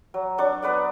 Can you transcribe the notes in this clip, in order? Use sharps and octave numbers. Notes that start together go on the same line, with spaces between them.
F#3
F#3 D4 C#6
B3 B4 D5 F#5